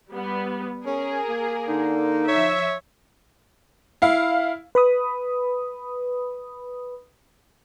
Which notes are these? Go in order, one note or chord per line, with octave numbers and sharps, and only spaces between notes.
G3 B3
C#4 G#4 A#4
A#3
D3 D#4
F3 C#5 E5
E4 F5
B4 B5 D#6